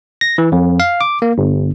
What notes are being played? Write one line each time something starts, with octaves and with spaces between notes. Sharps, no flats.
A#6
E3
F2
F5
D6
A#3
G1